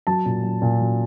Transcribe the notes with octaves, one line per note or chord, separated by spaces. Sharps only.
F#3 A5
A#2
F#3
A#2
F#3